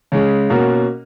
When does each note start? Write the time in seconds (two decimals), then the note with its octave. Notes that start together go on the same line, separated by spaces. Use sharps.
0.12 C#3 G#3 C#4
0.50 B2 A#3 C#4 F#4 A#4